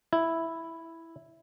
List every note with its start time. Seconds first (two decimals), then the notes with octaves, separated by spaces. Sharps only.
0.13 E4